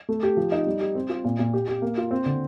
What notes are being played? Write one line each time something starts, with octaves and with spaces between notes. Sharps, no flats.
A3
G4
F3
D#4
G3
G4
C4
F4
A#2
A#2
G4
G4
A#3
F4
C4
D3